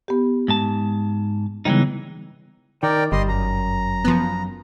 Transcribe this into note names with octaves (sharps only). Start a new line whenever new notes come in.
B3 G4
G#2 A5
C#3 E3 G3 G#3 B3 D#4
D#3 A#4 D5 G5
G1 G3 D#5 C6
F#2 A#5
F3 B3